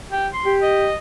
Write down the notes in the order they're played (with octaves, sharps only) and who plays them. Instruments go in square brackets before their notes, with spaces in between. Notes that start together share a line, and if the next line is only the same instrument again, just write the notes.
[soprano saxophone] G4
C6
[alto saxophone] G4
[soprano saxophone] D#5